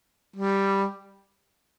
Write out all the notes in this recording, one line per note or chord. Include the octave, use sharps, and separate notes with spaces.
G3